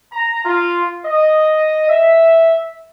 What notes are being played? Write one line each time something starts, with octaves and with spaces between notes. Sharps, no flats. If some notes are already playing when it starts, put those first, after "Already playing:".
A#5
F4
D#5
E5